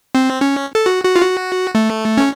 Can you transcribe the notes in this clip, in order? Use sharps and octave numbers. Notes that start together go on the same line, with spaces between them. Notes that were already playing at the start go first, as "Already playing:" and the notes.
C4
C#4
A4
F#4
F#4
F4
F#4
A3
C#4